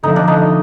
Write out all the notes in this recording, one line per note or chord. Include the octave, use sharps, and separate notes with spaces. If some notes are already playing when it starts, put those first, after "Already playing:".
D3 F3 A3 C4 D#4 F4
D4
D#4